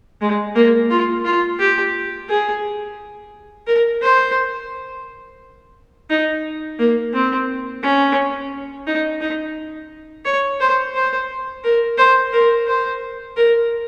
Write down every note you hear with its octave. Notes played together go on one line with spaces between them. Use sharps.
G#3
A#3
F4
F4
G4
G#4
A#4
C5
D#4
A#3
C4
C#4
D#4
D#4
C#5
C5
C5
A#4
C5
A#4
C5
A#4